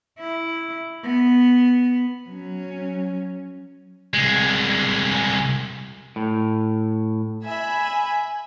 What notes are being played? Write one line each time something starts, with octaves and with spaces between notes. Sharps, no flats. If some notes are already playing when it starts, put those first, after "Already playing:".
E4
B3
F#3 C#4
C2 G#3
A2
E5 G#5 B5